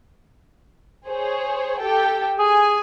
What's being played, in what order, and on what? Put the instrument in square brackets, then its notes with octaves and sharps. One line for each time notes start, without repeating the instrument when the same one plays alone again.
[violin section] G#4 C5 C#5
G4 A4 G5
[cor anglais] G#4 [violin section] G#5